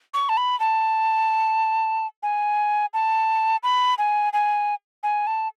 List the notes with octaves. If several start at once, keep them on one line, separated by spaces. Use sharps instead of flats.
C#6
A5
B5
A5
G#5
A5
B5
G#5
G#5
G#5
A5